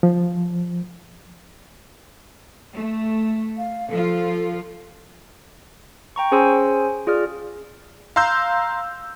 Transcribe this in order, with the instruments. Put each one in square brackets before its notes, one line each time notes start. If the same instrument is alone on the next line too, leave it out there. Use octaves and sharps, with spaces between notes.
[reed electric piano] F3
[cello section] A3
[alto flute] F5
[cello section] F3 F4 [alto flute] A4
[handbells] G5 A#5 C#6
C#4 G#4 C5 G#5 C6 E6
F4 G#4 D5 F6
[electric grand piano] F5 A#5 C6 E6 G6